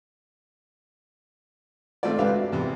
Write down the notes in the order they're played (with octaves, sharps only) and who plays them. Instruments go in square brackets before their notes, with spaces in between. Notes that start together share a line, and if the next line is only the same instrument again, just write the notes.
[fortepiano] G#1 A3 C4 F4 D5
C#2 D4 G4 B4 E5 F5
F#4
E2 C3